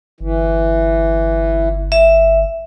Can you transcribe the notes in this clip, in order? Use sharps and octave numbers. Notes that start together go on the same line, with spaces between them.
G1 E3
E5